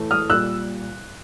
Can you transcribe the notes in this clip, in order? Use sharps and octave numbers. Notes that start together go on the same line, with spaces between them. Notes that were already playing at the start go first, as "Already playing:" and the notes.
Already playing: A2 E3 A3
D#6 F6
A#2 G3 E6 F#6